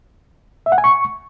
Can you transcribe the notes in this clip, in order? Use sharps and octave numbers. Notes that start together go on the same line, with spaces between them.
E5
F#5
G#5
C#6